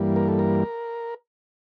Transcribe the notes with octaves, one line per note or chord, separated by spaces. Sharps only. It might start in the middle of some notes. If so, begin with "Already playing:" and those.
Already playing: G2 E3 G3 A#3
A#4
A4
A#4